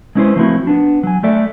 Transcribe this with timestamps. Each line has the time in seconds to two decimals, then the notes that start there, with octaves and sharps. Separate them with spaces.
0.15 G#3 B3 C#4 E4 B4 C5
0.36 F3 A3 A#3 C4 E4 F#4
0.67 B3 D4
1.03 F#3 G#5
1.23 A3 A4 D5 E5